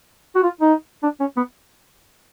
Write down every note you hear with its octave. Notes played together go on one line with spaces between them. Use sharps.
F#4
F4
D#4
D4
C#4
B3